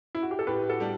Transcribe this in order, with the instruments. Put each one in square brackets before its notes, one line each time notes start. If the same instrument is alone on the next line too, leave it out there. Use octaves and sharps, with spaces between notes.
[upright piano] E4
F#4
G4
A4
[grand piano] A2 [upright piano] G4 B4
[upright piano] F#4 A4
[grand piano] G3 D4